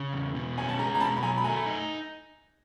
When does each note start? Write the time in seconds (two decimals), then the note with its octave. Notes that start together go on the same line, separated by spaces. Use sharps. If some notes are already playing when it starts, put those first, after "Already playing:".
Already playing: C#3
0.13 E2
0.35 B2
0.57 C#4 G#5
0.69 A5
0.79 G#3 G#5 A#5
0.95 A#5
1.00 B2 A5 B5
1.17 B5
1.23 F#3 G#5 A#5
1.37 B5
1.44 A3 G#5 A#5
1.66 D#4